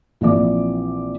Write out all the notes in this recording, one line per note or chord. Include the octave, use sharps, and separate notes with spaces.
A#1 E3 C4 D5 D6